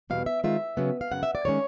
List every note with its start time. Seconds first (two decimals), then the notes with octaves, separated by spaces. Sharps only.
0.10 E2 B2 G3 F5
0.26 E5
0.44 D#3 G#3 C4 F4 E5
0.77 C#3 F#3 B3
1.01 F5
1.11 F#2 C#3 F#5
1.23 E5
1.35 D5
1.45 D#3 G#3 C#4 C#5